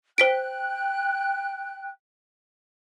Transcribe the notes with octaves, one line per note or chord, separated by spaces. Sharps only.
C5 G5 F#6 B6 D7